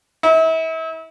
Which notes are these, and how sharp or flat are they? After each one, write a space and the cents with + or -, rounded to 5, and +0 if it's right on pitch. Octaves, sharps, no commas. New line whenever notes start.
E4 -35